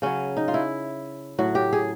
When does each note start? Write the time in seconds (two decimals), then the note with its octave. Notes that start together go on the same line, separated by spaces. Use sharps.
0.02 C#3 F#3 C#4
0.37 D#4
0.48 F4
0.54 E4
1.38 A2 F#3 F#4
1.55 G4
1.73 G#4